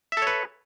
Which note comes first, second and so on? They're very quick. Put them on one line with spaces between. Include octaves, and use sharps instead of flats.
E5 A4 C#5 B4